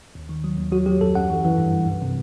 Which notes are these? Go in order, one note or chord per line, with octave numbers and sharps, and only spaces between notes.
D#2
D#3
F#3
D#2
F#3 F#4
F#3 G4
F#2 A4
F#2 F#5
E3
E3
G2
G2
C2
C3